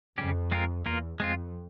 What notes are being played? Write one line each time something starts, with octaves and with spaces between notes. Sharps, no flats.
F2 C#3 G3 C#4 G4
G#3 C4 F4 A#4
E2 A#3 F4 A#4
F2 G#3 C4 F4